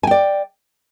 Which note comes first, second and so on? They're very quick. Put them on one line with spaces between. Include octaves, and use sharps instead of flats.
G#5 G5 D5